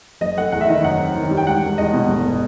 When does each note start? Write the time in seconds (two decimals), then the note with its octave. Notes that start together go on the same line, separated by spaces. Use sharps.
0.21 F#1 D#5
0.38 A3 F#5
0.52 E2 F#5
0.61 E5
0.68 D#3 D#5
0.83 F#2 F#5
0.99 C4
1.15 D#3
1.31 G3
1.37 G5
1.47 E1 F#5
1.62 E1
1.78 E2 D#5
1.94 B2
2.09 G1
2.25 B3